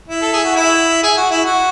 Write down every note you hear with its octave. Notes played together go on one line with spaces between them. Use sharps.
E4
A4
G#4
F#4
E4
G#4
F#4
E4
F#4